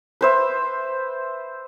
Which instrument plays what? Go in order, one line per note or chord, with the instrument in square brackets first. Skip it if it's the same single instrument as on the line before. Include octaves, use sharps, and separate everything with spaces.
[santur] B4 C5 E5